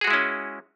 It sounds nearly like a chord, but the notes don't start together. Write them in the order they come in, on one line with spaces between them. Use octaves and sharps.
G#4 F#4 G#3 E4 C#4